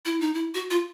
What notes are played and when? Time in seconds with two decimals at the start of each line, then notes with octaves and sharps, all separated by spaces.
0.05 E4
0.20 D#4
0.34 E4
0.54 F#4
0.71 F4